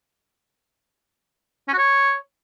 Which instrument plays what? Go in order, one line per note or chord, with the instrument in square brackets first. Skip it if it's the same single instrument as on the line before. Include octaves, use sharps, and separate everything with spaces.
[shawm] C#4
F#4
C#5